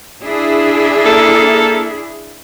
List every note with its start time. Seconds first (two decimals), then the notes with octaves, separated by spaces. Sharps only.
0.24 D4 E4 G#4
1.06 A#3 A4